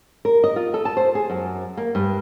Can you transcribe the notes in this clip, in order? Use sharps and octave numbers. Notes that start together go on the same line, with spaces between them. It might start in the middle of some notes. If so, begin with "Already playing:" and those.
A#4
D#5
F4
A4
A5
C5
G#4
F#2
A#3
G2